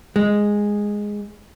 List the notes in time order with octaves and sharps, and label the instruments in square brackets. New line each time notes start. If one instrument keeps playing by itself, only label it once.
[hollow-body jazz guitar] G#3